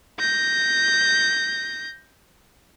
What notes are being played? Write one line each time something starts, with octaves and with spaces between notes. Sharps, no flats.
G6 A#6